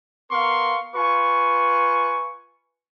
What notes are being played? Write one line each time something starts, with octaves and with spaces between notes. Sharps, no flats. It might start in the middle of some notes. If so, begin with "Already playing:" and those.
B3 A#4 F5 C6 C#6
F4 B4 G#5 C#6